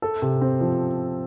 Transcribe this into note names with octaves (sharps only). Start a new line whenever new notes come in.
A4
C3
C4
F3